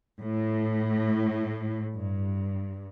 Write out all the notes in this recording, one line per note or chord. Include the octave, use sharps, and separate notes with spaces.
A2
G2